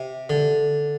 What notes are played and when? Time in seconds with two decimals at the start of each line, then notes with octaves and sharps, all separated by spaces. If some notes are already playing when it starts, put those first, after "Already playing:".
Already playing: C3
0.30 D3